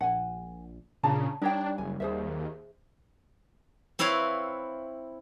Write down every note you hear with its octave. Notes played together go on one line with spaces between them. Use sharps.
A#1 F#5 G#5
A#2 C#3 D4 A5 A#5
G3 D4 D#4 C#5 G5
F#1 G#5
D#2 G#4 C5 E5
C4 E4 B4 C#5 F5